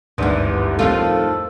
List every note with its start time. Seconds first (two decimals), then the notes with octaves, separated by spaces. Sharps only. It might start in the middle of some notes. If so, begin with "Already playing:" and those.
0.18 G#1 D2 G2 D3 E3
0.79 F2 A2 D#3 A3 C4 F4 A4